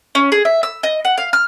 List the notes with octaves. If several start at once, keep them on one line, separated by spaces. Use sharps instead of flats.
C#4
G#4
E5
E6
D#5
F#5
F5
F6